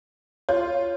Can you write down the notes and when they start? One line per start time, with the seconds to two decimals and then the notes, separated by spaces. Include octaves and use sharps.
0.49 F4 C#5